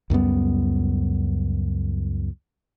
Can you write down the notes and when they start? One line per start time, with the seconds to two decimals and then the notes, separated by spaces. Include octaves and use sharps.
0.10 C#2 F#2 G3 B3